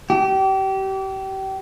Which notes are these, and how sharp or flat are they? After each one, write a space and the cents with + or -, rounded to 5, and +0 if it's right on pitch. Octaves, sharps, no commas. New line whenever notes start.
G4 -30